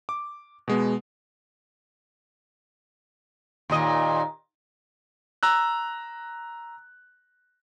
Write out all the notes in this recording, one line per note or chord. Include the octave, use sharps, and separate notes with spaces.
D6
B2 G#3 B3
D#2 A#2 D#5
A#5 E6 F#6